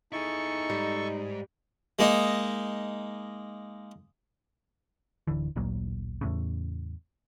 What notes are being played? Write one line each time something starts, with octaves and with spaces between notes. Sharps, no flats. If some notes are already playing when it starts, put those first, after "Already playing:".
D#4 E4 G#4 A4 C#6
G#2 G3
G#3 A#3 D#4
D1 D3 E3
D1 A1 A#2 F#3
E2 A2 C#3